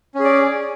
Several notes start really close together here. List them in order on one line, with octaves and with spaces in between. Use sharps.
C#4 G#4 D5